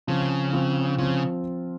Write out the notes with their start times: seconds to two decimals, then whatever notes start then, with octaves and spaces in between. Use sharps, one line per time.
0.08 C#3 F3 C4 F4
0.53 F3 C4 F4
0.98 C#3 F3 C4 F4